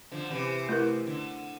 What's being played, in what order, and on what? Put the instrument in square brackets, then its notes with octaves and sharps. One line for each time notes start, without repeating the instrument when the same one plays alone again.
[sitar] D3 F3
C3 E3
[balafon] A3 E4 A#4
[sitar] D3